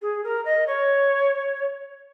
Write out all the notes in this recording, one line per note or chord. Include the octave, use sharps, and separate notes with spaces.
G#4
A#4
D#5
C#5